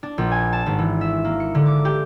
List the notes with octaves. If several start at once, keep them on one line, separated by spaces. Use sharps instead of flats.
D4
A#1
G#5
A5
G#1
E3
E5
A#3
C#7
D3
D6
G4